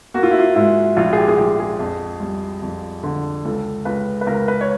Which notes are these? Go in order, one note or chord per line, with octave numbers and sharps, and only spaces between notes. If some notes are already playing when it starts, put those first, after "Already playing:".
A#3 F#4
F4
E4
F4
G#2 E4
A#1 F4
G#4
G4
G#4
A#1 G4
G#4
F2
G3
F2
D3
C#2 A4
C#2 B4
B4
C#2 A#4
B4
C#5